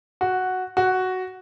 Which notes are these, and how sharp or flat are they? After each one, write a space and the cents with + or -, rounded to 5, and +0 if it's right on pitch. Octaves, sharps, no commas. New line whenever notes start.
F#4 +0
F#4 +5